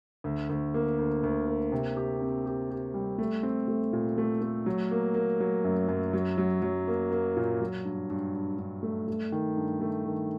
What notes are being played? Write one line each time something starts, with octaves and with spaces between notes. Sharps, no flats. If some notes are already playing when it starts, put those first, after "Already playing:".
D2
D2
A#3
D2
D2
A#3
C3
G4
C4
G4
G4
G3
A3
C4
A3
A#2
A3
A3
F#3
A#3
A#3
F#3
F#2
F#2
F#3
F#3
F#3
A#3
A#3
A#2
F#3
G2
G2
G2
G2
A3
A3
D#3
G2
A3
D#3